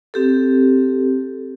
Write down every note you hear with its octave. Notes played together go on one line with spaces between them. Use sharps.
C4 G4 A4